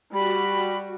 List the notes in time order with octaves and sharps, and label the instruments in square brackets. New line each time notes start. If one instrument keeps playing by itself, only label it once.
[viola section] G3 F#4 [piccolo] B5